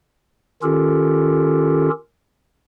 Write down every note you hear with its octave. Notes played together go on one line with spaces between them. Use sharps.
D#3 C#4 F4 G4 A4 A#4